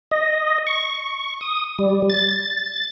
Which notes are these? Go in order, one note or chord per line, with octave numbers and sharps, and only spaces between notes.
D#5
C#6
D#6
G3
A6